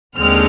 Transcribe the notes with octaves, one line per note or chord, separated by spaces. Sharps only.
D#2 D3 G#3 C4 F6